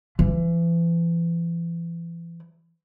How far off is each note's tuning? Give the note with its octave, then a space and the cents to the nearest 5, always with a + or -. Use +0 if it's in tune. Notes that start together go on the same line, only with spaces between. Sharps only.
E3 +35